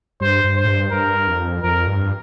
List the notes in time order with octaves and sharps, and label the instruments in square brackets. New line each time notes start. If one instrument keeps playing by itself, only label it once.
[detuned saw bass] G2 [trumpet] C5
[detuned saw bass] G2
[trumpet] C5
[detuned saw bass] A2
G2
[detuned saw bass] G2 [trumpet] A#4
[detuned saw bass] F2
[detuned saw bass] F2 [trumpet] A#4
[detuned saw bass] G2